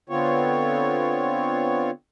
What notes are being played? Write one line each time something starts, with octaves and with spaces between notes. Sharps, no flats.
D3 B3 C4 F4 C#5